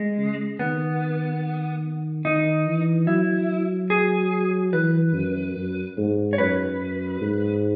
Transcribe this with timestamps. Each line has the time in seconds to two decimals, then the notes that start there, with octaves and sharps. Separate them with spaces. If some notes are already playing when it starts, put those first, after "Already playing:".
Already playing: G#3
0.18 C#3
0.59 D#3 B3
2.25 D#3 D#4
2.66 E3
3.07 F#3 E4
3.90 G#4
4.73 E3 B4
5.14 F#2
5.56 F#2
5.97 G#2
6.33 C#5
6.38 F#2 B4
7.21 G#2